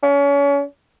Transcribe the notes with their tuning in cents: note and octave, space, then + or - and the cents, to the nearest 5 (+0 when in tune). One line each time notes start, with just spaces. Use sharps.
C#4 +35